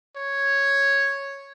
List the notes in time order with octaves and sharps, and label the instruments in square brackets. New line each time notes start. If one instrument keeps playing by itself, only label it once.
[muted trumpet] C#5